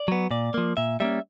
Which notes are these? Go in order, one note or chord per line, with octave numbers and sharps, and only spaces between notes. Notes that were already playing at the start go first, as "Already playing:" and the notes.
Already playing: D5
F#3 B3
A#2 D5
F3 A#3
A#2 E5
G3 A#3 C#4 E5